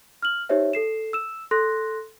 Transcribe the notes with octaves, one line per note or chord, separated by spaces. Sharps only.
F6 F#7
D#4 G4 C5 C#5 E5
A4 C7 E7
E6 E7
A4 C6 F#6 A#6